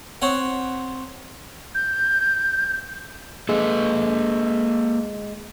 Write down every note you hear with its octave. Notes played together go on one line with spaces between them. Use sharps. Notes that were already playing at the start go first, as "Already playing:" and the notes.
C4 C#5 F#5
G6
G#3 A#3 A4 B4